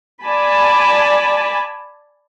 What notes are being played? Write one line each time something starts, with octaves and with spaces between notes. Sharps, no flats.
D5 G#5 A5 B5